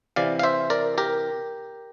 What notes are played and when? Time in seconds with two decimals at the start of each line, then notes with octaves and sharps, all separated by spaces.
0.16 C3 E3 D5 F5
0.39 F5
0.43 C5 E5
0.70 A#4 D5
0.98 G4 A#4